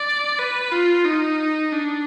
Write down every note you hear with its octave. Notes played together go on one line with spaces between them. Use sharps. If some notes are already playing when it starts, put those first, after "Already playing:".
Already playing: D5
B4
F4
D#4
D4